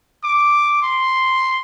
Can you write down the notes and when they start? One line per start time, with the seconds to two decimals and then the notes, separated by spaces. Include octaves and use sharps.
0.24 D6
0.82 C6